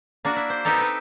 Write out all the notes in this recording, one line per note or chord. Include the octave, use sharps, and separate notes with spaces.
A#3 D4 F#4
E4
C5
B3 C4 D#4 G4 A4 A#4
C4 B4